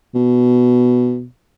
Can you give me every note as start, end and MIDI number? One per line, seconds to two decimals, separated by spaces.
0.15 1.25 47